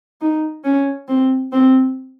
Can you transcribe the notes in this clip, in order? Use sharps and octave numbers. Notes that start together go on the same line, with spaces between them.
D#4
C#4
C4
C4